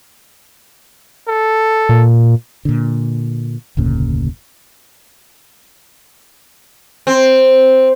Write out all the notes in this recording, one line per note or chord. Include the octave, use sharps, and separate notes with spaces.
A4
A#2
A#2 D3
F1 D2 A#2 C#3
C4